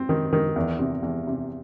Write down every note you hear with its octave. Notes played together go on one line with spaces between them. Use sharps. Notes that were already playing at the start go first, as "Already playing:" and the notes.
Already playing: C4
D#3
D#3
E2
C3
E2
C3